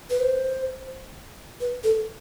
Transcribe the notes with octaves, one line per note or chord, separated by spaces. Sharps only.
B4
C5
B4
A4